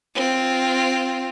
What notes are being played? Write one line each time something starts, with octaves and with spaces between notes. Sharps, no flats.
C4 F4